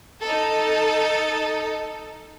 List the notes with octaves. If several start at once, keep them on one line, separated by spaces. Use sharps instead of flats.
D#4 A4